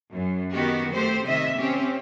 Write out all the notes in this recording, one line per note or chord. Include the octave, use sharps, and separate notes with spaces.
F#2
D#3 B3 F#4 G4
A3 C4 G4 C5
C3 D#3 D#5 E5
C4 C#4 G4